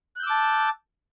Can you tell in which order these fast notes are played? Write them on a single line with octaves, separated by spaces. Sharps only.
F#6 G6 E6 D6 A5